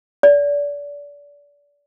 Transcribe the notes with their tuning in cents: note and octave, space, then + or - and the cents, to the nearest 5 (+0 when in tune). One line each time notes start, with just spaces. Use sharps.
D5 -30